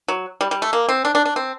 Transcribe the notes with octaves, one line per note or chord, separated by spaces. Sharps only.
F#3
G3
G3
A3
A#3
C4
D4
D4
D4
C4